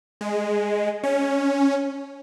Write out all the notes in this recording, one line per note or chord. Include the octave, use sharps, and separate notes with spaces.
G#3
C#4